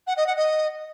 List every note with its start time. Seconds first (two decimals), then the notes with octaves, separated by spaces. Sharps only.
0.07 F#5
0.17 D#5
0.26 F#5
0.36 D#5